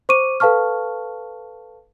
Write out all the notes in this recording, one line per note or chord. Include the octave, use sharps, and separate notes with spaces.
C5 C#6 D6 D#7
A4 B4 F5 A5 C#6 F6